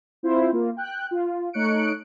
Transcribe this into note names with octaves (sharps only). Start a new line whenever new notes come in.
C4 E4 F4 C5
A#3 F4
G5 F#6
F4
A3 D#4 C#5 F#6 C#7 D7